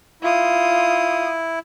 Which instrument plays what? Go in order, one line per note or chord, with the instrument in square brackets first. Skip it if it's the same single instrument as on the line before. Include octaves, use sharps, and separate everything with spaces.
[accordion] E4 [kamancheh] F4 D#6